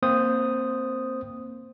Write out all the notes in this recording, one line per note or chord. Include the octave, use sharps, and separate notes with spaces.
A#3 C4 C5 D#6